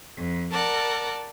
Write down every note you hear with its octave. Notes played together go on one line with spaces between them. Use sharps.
F2
A#4 D5 F#5 A5